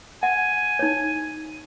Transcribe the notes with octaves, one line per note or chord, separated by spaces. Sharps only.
F#5 G#5
D#4 C#5